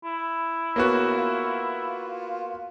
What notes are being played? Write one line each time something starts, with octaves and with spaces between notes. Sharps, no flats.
E4
C#3 A#3 B3 F#4
F4